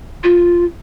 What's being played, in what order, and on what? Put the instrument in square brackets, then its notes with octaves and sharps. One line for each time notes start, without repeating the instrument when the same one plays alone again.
[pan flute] F4